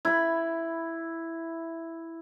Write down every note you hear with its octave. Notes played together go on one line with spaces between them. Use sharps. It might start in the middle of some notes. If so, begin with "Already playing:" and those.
E4 B5